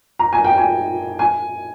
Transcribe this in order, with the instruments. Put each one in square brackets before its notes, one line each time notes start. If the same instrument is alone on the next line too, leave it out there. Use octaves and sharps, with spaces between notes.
[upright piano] A#5
G#5
G5
G#5
G#5